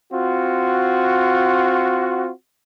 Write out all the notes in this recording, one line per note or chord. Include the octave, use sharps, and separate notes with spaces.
C4 F4 F#4